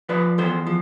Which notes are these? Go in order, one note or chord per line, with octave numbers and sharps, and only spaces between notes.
F3 B4 D5
E2 A4 C5
F3